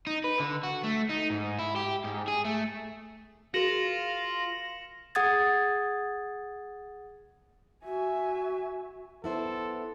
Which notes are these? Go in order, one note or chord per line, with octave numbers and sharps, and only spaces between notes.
D#4
B4
D3
F#4
A3
D#4
G#2
E4
G4
G#2
G#4
A3
F4 F#4 G#4 A#4 A#6 C#7 E7 F#7
G#4 F#5 D#6 G#6 A6
F#4 E5 G#5
B3 E4 A4 C5